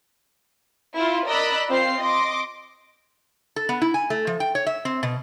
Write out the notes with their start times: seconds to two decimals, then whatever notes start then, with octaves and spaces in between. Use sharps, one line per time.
0.95 E4 F4
1.27 A#4 D5 D#5 B5 E6 F#6
1.69 C4 F4 C5 C7
2.00 D#5 C6 D6
3.56 A4
3.69 B3
3.82 E4
3.94 G#5
4.10 A3
4.27 F3
4.40 G5
4.55 C#5
4.66 E5
4.85 C4
5.03 B2